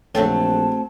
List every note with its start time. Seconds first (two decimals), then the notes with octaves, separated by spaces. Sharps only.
0.15 A#1 A2 C#3 F#3 A3 C4 A5